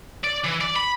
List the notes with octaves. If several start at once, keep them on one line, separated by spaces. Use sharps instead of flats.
D5
E3
D5
B5